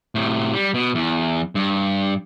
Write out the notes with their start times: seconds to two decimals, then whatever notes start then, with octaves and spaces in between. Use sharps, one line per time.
0.15 A2 C3
0.53 G3
0.74 B2
0.95 E2
1.55 G2